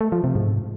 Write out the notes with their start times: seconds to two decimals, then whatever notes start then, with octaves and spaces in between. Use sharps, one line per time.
0.01 A3
0.12 F3
0.24 C3
0.35 G#2